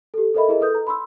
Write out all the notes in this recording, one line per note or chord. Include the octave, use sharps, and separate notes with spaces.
G4 A4
A4 A#4 C5 D#5 E5 B5
E4 G#4 A#4 D#5
A4 B4 D#6 G6
A#5
B5 C6 E6